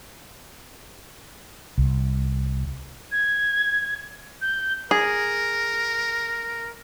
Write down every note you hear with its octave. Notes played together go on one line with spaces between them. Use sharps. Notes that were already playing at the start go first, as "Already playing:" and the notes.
C2
G#6
G6
G#4 A#4